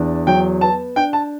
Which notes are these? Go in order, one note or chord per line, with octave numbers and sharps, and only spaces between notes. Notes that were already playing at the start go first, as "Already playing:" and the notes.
Already playing: E2 D4
F#3 G5
B3 A5
D4 G5
A5